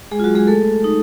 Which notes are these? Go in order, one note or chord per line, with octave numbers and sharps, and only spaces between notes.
G#3 G#4
F4
F#3 F#4
G#3 G#4
A3 A4
D#4